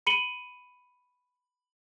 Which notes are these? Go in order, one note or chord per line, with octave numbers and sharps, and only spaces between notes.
B5 C#7 D#7 F#7 G7